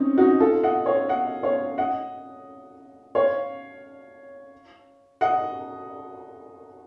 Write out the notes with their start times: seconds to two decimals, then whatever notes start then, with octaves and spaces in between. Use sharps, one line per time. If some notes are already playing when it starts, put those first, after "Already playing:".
Already playing: C4 C#4 D#4
0.18 D#4 F#4
0.40 F4 A4
0.63 D#5 F#5
0.86 C#5 F5
1.09 D#5 F#5
1.43 C#5 F5
1.78 D#5 F#5
3.15 C#5 F5
5.21 D#5 F#5